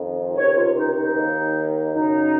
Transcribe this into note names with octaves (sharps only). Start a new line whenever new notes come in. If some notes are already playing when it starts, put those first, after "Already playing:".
Already playing: F2 D#3
C#2 C3 D#3 C#5
F4
D#4
D#4
D#2 D#3
F#2 C#3 D#4